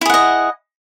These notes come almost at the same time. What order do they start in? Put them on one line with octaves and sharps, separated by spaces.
E4 G#4 F#5 D#5